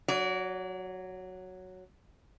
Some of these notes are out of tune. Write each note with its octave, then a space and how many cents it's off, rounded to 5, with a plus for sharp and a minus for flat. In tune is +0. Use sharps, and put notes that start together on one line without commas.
F#3 +0 D5 -35